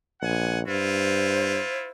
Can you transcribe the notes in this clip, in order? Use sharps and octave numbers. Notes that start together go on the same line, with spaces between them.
A#1 F#5 G#5
G2 E4 F4 C5